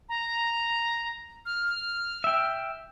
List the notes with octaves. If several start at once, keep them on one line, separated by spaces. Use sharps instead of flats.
A#5
F6
E5 G5